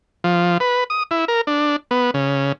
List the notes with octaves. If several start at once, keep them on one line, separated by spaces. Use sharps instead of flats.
F3
B4
D#6
E4
A#4
D4
B3
C#3